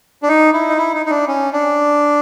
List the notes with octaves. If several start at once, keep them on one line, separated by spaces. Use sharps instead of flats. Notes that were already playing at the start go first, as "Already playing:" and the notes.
D4
D#4
E4
D#4
E4
D#4
D#4
D4
C#4
D4